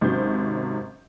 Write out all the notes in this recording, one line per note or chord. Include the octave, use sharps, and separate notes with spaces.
G#1 G#2 C3 F#3 C#4 G6